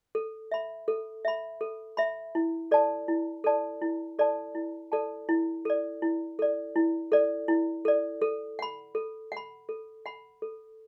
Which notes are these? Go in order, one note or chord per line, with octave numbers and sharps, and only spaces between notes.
A4
E5 B5
A4
E5 B5
A4
E5 B5
E4
A4 D5 A5
E4
A4 D5 A5
E4
A4 D5 A5
E4
A4 D5 A5
E4
A4 D5
E4
A4 D5
E4
A4 D5
E4
A4 D5
A4
F#5 B5
A4
F#5 B5
A4
F#5 B5
A4